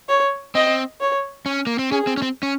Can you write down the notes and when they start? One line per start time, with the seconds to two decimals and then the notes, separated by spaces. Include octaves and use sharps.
0.09 C#5
0.55 C4 D#5
1.00 C#5
1.46 C#4
1.67 A#3
1.79 C4
1.92 C#4 G#4
2.07 C4
2.17 C#4
2.22 C4
2.43 C#4